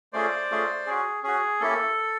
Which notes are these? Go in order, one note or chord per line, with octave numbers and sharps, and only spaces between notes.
A3 C#4 F4 G#4 C5 D5
A3 C#4 F4 G#4
C#4 F#4 G#4
C#4 F#4 G#4
A#3 C#4 E4 G4 A4